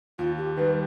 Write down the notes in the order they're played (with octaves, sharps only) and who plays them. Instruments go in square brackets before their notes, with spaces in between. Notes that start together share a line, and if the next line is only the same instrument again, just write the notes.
[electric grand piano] D#2 [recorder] F4
[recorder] G4
[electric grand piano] D#3 G3 [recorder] B4